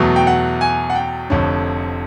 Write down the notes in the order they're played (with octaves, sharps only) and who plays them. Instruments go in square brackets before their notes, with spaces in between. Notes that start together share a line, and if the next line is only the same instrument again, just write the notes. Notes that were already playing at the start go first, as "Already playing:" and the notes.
Already playing: [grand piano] E2 B2 F#3 A3
G5
F#5
G#5
F#5
G5
F1 F2 D3 C#5